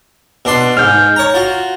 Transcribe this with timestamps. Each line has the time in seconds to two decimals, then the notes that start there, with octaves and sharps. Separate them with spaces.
0.45 B2 D4 C6
0.77 G#2 F6 G6
1.16 C#5 A#5
1.34 F4 F#4